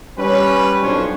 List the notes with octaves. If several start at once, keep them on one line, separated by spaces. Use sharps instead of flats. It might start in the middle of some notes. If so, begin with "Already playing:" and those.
G3 C#4 B4
B1 F2 C#4 D4 C5 C#5